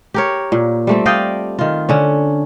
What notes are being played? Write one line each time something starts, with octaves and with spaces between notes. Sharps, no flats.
G4 A#4 C#5
A#2
G3 A3 C4
D5 D#5 F5 G5
D#3 F4
D3 C#4